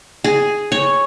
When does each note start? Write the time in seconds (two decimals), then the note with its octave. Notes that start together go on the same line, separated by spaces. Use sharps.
0.24 G#4
0.72 C#5